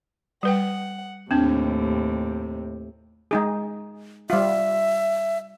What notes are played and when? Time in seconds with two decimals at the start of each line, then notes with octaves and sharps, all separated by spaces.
0.43 G3 B4 F#5 G5
1.31 D#2 A2 C3 C4 D4
3.31 G#3 D#4 G#4
4.30 G3 F4 E5